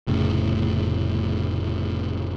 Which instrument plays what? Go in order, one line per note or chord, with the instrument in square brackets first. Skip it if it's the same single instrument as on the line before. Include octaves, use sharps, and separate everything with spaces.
[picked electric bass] F1 A2 C#3